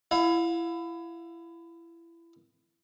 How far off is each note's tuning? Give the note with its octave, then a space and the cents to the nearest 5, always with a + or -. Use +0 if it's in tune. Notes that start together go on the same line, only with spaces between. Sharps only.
E4 +25 F5 +35